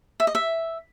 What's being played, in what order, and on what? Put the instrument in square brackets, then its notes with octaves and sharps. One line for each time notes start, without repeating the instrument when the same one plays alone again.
[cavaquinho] E5
D#5
E5